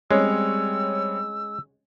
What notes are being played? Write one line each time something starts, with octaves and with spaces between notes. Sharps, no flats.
G3 G#3 C4 C#4 C#5 E6